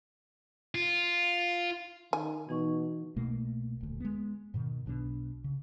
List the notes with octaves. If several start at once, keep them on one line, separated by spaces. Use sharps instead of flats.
F4
D#3 G#5
B2 E3 D#4 C#6
C2 B2 A3 A#3
D#1 D2
G#3 B3
G#2 B2 D#3
B1 B2 C4 D4
C#3